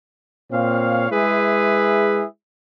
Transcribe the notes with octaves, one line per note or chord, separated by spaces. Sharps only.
A#2 C4 C#5 F5
G#3 E4 G#4 B4 E5